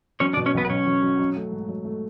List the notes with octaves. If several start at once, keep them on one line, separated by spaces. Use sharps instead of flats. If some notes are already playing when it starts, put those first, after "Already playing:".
F#3 C#4 C#5
D4 D5
B2
C#4 C#5
B1 B3 B4
B4
B1 C#4 C#5
F#3
F#3
F#3
A3
G#2
F#3
A3